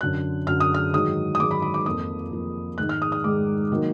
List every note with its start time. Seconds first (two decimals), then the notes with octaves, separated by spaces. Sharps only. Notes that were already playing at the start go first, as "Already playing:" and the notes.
0.01 F#2 D3 F#3 F#6
0.47 F#2 D3 F#3 F6
0.60 D#6
0.74 F6
0.93 G#2 D#3 F#3 D#6
1.35 D#6
1.39 G#2 D#3 F#3 D6
1.51 B5
1.62 B5
1.74 D6
1.86 F2 F3 A#3 D#6
2.31 F2 F3 A#3
2.78 G#2 D#3 G#3 F#6
2.89 F6
3.02 D#6
3.12 D#6
3.24 G#2 D#3 G#3 D6
3.72 D#3 F#3 A#3